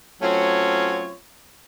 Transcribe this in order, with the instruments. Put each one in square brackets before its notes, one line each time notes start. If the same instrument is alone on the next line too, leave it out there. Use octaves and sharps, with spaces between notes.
[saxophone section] F#3 A3 C4 C#4 F4 C#5